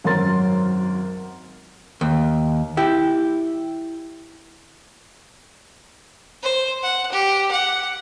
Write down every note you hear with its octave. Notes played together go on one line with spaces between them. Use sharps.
G#1 F#2 C#4 A#4 C6 A6
D#2
E4 G4
C5
F#5
G4
F#5